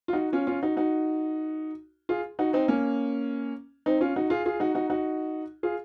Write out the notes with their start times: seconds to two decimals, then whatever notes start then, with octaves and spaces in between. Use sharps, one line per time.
0.08 F4
0.13 D#4 F#4
0.33 C#4 F4
0.47 C#4 F4
0.62 D#4 F#4
0.77 D#4 F#4
2.09 F4 G#4
2.39 D#4 F#4
2.53 C4 D#4
2.68 A#3 C#4
3.86 C4 D#4
4.01 C#4 F4
4.16 D#4 F#4
4.30 F4 G#4
4.46 F4 G#4
4.60 D#4 F#4
4.75 D#4 F#4
4.90 D#4 F#4
5.63 F4 G#4